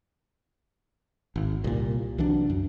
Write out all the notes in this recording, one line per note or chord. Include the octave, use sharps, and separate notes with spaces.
G#1
C2 A#2
C2 E3 F#3 D4
F#2